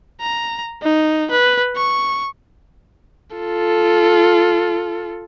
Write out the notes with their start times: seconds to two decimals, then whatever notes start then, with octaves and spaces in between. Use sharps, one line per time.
0.21 A#5
0.83 D#4
1.31 B4
1.76 C#6
3.36 F4 A4